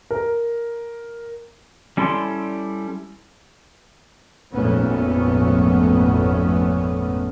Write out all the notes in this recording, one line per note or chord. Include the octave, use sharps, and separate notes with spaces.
A#4
G3 C#4 E4 A4 C6
G#1 F2 A#2 A3 B3 C#4